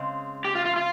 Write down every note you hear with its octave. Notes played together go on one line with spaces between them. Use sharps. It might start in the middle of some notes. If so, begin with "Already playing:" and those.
Already playing: C#3 G#3 C4
G4
F4
F4
F4